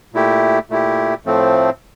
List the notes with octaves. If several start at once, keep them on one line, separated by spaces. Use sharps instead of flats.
A#2 A3 E4 G4
A#2 A3 E4 G4
A2 F3 A3 C4